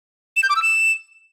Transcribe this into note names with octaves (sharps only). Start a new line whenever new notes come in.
E7
G6
D6
E6
E7